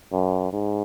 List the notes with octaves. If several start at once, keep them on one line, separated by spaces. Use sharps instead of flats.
F#2
G#2